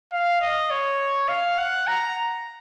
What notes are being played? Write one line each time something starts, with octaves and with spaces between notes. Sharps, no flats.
F5
D#5
C#5
F5
F#5
A#5